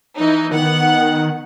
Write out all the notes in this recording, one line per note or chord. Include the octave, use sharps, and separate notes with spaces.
E3 D#4
D#3 B3 F#5